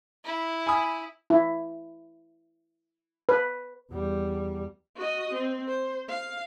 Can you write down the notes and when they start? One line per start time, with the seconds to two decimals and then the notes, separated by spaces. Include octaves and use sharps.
0.25 E4
0.67 G#5 B5 D#6
1.30 E4
3.29 B4
3.92 E2 G3
4.96 F#4 D#5
5.34 C4
5.67 C5
6.08 F5